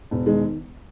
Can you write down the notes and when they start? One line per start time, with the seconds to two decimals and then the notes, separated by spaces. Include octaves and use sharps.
0.11 E1
0.26 D#3 G#3